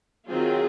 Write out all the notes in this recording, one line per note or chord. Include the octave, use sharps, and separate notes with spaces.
D#3 F#3 C4 F4 G#4